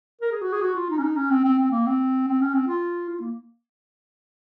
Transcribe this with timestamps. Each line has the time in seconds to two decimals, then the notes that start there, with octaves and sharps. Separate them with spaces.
0.21 A#4
0.32 G#4
0.42 F#4
0.52 G#4
0.62 F#4
0.75 F4
0.90 D#4
0.98 C#4
1.03 D#4
1.17 C#4
1.30 C4
1.44 C4
1.58 C4
1.71 A#3
1.86 C4
2.27 C4
2.41 C#4
2.54 C4
2.67 F4
3.09 F4
3.20 A#3